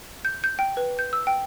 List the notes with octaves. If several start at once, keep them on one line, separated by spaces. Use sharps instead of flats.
G6
G6
G5
B4
G6
E6
G5